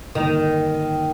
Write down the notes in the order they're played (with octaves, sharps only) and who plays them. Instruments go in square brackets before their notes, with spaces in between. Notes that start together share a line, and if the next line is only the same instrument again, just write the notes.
[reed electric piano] G2 D3 G3 A#3 [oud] D#3